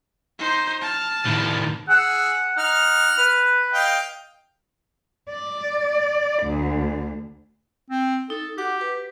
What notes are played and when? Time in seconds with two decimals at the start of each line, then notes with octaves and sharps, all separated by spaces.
0.39 D#4 C5
0.81 A5 F6
1.26 A2 D#3
1.89 G#4 F#5 E6
2.57 D#4 F#5 F6
3.18 B4
3.74 D#5 F5 G5
5.30 D5
6.43 D2
7.90 C4
8.30 D#4 A4
8.58 F#4 G4 F#5 D6
8.81 B4